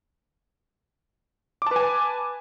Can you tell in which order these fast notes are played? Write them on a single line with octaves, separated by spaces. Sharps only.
D6 A5 B4 G#5